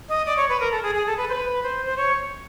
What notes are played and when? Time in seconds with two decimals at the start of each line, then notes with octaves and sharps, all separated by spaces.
0.09 D#5
0.26 D5
0.37 C#5
0.49 B4
0.60 A#4
0.72 A4
0.83 G#4
0.95 G#4
1.06 A4
1.17 B4
1.29 C5
1.33 B4
1.63 C5
1.85 C5
1.97 C#5